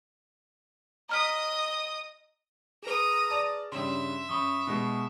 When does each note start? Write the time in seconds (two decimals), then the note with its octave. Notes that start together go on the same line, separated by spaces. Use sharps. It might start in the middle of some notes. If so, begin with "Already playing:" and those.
1.09 D#5 A#5 D#6 F6 B6
2.83 G#4 B4 A#5 D#6
3.30 D5 A5
3.72 G2 C#3 E5 C6
4.29 F#2 B5 C#6 D#6
4.67 B2 G#3